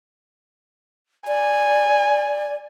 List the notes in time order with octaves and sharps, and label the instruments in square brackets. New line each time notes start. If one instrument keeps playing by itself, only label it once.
[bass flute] D5 [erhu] G#5